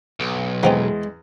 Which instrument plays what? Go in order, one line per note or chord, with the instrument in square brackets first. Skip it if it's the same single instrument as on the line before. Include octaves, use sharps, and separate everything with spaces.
[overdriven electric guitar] B1
[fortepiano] E2 [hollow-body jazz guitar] G#3 [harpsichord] B3 C4 D#4